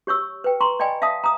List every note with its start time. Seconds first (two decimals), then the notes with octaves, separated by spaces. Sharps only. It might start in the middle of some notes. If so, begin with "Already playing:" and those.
0.07 G4 C#5 C#6 E6
0.44 B4 G5
0.61 A#5 C6 C#6
0.80 D5 D#5 G5 G#5 B5
1.02 E5 F5 A5 D#6
1.24 A#5 D#6